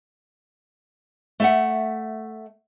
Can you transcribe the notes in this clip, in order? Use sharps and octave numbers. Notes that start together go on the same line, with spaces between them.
A3 E5 F#5